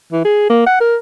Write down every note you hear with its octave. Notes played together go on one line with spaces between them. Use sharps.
E3
G#4
A#3
F#5
A#4